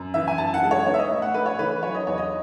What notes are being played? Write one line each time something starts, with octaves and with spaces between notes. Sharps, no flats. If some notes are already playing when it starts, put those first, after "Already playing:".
Already playing: F#2
E3 E5
G#5
F#2 A5
F#5
G#3
C#5
B3 C#5
E5
D#5
A2
F#5
A1 B4
C#5
E3 B4
B4
F#3 C#5
D#5
E2 C#5
D#5